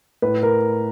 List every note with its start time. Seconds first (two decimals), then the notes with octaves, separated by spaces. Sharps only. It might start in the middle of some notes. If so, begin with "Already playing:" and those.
0.22 A2 B4
0.43 A#4